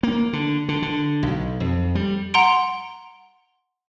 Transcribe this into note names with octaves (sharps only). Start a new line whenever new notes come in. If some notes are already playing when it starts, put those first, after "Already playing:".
A#3
D3
D3
D3
B1
F2
G3
F#5 A#5 C6 D7